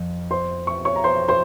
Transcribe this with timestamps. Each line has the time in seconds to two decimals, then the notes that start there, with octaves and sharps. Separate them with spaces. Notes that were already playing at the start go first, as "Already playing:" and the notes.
Already playing: F2
0.31 C5 C6
0.67 C#6
0.85 C#5 C#6
0.96 A#5
1.04 C5 C6
1.28 C5 C6